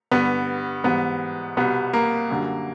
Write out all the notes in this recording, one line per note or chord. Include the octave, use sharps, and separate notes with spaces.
G2 D3 G3 B3
G#2 E3 G3 B3
C2 B2 G3 B3
A#3
F#2 D3 G3